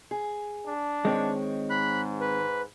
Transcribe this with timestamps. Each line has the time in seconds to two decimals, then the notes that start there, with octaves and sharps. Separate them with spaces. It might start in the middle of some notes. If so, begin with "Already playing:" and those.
0.11 G#4
0.66 D4
1.05 D#3 G#3 C4 C#5
1.70 G#2 B5 F#6
2.21 B4